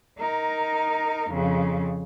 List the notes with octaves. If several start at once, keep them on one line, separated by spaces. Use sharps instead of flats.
D#4 A#4
F2 C#3